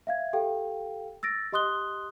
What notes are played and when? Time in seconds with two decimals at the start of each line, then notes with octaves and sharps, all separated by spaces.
0.07 E5 F5 G#6
0.33 G4 A4 F5 G5
1.23 E6 A6 A#6 D7
1.52 G4 D#5 C6 D#6 F#6 G7